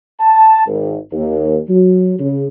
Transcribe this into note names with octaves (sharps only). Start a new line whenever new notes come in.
A5
G#1
D#2
F#3
C#3